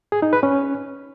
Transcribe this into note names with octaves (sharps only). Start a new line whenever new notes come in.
G#4
D#4
B4
C#4